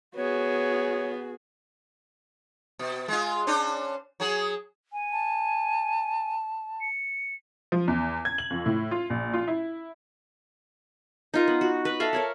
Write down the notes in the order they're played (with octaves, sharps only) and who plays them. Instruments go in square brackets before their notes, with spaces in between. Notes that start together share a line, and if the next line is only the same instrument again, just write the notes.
[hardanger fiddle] B3 [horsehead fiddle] F#4 G#4 [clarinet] C#5
[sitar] B2
G#3 F4
C#4 D4 C5
F#3 G#4
[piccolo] G#5
[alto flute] A5
[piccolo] C#7
[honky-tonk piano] F3
E2
G#6
F#7
F2
A2
F4
A#1
F4
E4
[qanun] D#4 F4 A#4
B3
F#4
B4
A4 E5 F5 A#5
A#4 C#5 D5